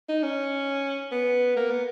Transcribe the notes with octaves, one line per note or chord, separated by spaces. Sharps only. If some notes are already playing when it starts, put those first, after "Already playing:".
D#4
C#4
B3
A#3
B3